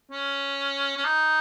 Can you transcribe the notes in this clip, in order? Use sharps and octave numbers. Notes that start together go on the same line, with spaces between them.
C#4
C#4
D#4